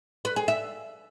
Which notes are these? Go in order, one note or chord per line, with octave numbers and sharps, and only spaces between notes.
B4
G#4
E5